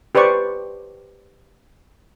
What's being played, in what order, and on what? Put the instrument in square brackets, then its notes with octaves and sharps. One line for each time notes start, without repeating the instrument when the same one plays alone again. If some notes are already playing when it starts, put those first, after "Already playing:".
[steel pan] G4 B4 C5 D5 C#6